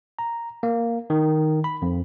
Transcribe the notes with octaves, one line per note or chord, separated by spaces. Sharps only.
A#5
A#3
D#3
B5
F2